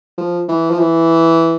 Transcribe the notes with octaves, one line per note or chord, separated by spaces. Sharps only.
F3
E3
F3
E3